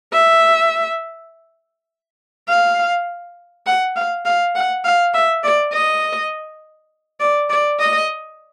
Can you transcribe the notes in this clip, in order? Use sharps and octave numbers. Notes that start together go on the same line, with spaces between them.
E5
F5
F#5
F5
F5
F#5
F5
E5
D5
D#5
D5
D5
D#5